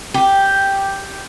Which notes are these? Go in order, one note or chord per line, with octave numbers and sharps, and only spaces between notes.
G4